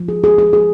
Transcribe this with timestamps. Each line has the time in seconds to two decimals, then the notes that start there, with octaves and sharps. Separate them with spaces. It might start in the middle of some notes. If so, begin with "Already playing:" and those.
Already playing: F3
0.08 G#4
0.24 G#4
0.38 G#4
0.53 G#4